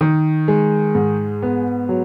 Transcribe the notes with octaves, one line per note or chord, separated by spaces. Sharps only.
D#3
G#3
G#2
B3
F#3